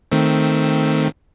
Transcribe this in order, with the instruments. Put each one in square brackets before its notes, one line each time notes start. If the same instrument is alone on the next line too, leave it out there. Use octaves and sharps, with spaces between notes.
[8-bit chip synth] D#3 A3 C4